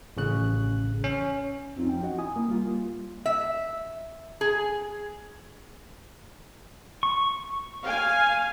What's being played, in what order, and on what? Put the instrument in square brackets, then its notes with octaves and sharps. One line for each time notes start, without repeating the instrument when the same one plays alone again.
[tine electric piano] A1 C#3 F#6
C#4
[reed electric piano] F2 C4 C#4 D#4 F4
F3 G5
F#4 D#5 F#5
E4 G#5 D#6
A#3
G3 A#3 F4
[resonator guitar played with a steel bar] E5
G#4
[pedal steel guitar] C#6
[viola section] F5 G#5